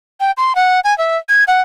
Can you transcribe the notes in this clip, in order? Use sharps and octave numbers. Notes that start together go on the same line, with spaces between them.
G5
C6
F#5
G#5
E5
G#6
F#5